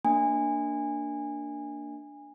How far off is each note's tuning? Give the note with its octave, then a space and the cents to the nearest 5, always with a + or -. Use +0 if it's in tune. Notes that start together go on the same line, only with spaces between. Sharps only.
A#3 -15 D4 +0 G#5 -20